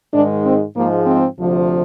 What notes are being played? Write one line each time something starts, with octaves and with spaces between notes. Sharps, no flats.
G#2 D#3 G#3 D4
C4
G#2 F3 G#3 A#3
C4
D2 C3 F3